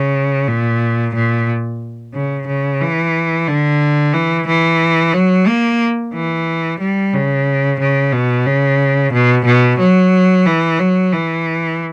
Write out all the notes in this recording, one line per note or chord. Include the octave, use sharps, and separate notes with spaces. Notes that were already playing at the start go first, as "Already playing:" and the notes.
Already playing: C#3
A#2
A#2
C#3
C#3
E3
D3
E3
E3
F#3
A#3
E3
G3
C#3
C#3
B2
C#3
B2
B2
F#3
E3
F#3
E3